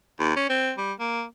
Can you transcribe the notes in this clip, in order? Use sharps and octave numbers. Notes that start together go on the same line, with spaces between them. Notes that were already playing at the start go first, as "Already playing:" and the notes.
D#2
C#4
C4
G3
A#3